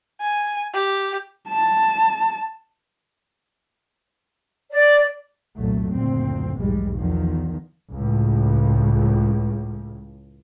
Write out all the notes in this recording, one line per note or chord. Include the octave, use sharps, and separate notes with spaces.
G#5
G4
A5
D5
C2 F2 A#2 F#3 A3
F#1 D2 A#2 C4
B1 E2 G#2 G3 G#3
E2 D#3 F3
C#2 A2